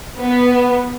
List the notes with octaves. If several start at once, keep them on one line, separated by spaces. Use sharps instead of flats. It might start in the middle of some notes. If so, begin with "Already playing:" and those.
B3